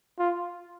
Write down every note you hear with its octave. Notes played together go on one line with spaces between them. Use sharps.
F4